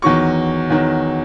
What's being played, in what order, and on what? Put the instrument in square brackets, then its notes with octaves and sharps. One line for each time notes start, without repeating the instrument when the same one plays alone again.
[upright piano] E2 D#3 F#3 C#6
E2 D#3 F#3